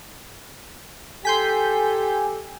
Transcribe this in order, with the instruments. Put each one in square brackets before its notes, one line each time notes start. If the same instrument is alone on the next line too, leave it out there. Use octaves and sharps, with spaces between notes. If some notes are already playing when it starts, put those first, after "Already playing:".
[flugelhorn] G4 [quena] A4 [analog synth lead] G#5 [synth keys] C6 G6 B6